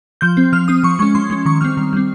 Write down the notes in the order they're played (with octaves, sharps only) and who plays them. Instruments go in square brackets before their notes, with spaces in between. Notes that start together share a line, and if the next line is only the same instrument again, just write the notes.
[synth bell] F3 G6
C4
F3 F6
C4 D#6
F3 C#6
G#3 C#6
C#4
F3 C6
G#3 C#4
D#3 C#6
G3 C4 F6
D#3
G3 C4